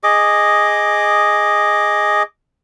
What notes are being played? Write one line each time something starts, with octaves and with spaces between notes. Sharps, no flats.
G#4 D#5 D6